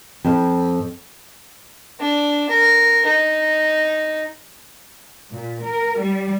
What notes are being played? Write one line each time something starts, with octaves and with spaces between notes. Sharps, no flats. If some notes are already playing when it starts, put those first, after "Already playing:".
F2
D4
A#4
D#4
A#2
A#4
G3